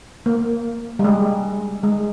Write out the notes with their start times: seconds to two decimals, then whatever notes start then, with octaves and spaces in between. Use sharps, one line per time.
0.26 A#3
0.99 G3
1.04 G#3
1.83 G#3